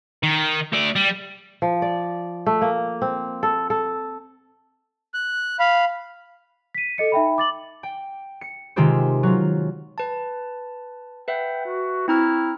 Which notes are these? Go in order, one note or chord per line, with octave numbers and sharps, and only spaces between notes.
D#3
A3 D5
G3
F3
D5
A3
A#3
C4
A4
A4
F#6
F5 B5
B6 D#7
A4 D#5 C#7
D#4 E5 G5 B5
D6 A6 F#7
G5
C#7
C3 D#3 G#3 F4 G4 C5
F#3 F4
B4 A5
B4 E5 F#5 G5
F#4
C4 E4 A#5 F6